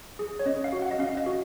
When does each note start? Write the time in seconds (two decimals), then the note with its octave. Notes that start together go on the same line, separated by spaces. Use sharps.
0.19 G#4
0.39 C#5
0.46 C#4 D#5
0.64 F5
0.72 F#4
0.82 F#5
0.91 D#5
0.99 C#4 F5
1.17 D#5
1.26 F#4